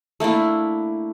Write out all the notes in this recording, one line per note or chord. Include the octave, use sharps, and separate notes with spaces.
A3 A#3 D4 E4